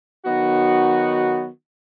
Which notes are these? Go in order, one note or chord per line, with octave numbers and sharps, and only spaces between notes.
D#3 F#3 B3 D#4 F#4